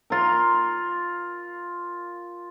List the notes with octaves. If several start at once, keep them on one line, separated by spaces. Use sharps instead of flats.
F4 A#4